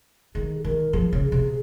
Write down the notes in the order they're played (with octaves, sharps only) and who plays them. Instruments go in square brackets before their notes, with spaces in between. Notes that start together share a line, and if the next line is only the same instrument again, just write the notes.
[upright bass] D#3 [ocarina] G#4
[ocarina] G#4
[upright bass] D#3 [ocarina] A#4
[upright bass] F3 [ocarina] G#4
[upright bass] C#3
C3